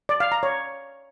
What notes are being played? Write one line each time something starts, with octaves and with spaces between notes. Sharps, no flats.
D5
F5
A#5
C#5